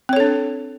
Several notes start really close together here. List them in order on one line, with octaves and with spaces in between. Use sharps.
C4 C#5 A4 D4